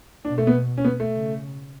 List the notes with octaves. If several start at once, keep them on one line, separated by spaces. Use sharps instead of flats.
B2 D4
A3
B3
C#4
B3
A3
C#3